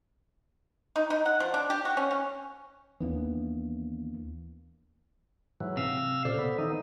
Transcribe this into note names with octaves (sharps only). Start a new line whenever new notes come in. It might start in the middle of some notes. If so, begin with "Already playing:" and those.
D#4
D#4
F#5
F3
D4
G4
F#4
C#4
C#4
D#2 E3 A#3 B3 D4
G#2 E3 F#3
C3 F5 E6
A#2 C#3 A4 C5 D5
B3
D#3 E3 D#4